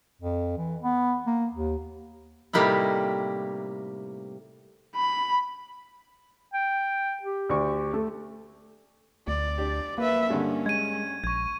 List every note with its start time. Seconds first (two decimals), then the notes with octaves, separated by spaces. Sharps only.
0.21 F2
0.58 E3
0.82 B3
1.27 A#3
1.54 D#2
2.53 A2 C3 G3 A#3 D#4 E4
4.96 B5
6.53 G5
7.23 G4
7.49 D2 C#6
7.93 A3
9.28 D2 D5
9.58 D4 G4
9.98 A#3 B4 E5
10.30 G2 D3 C#4
10.66 G#3 G#6 D#7
11.24 A#1 C#6 G#6